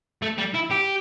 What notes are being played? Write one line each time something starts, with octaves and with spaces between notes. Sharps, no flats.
A3
G3
E4
G4